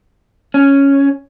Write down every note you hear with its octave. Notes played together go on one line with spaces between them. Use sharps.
C#4